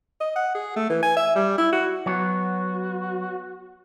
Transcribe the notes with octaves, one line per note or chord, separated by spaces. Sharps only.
D#5
F#5
G#4
A3
E3
G#5
E5
G3
E4
F#4
F#3 B3 F#4 C#5